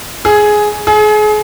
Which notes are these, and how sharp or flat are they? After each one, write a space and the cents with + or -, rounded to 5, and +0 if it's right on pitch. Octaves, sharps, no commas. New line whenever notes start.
G#4 +10
G#4 +35